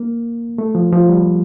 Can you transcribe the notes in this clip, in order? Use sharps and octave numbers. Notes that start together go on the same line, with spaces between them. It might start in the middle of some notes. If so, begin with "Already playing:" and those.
Already playing: A#3
A3
F3
F3
G3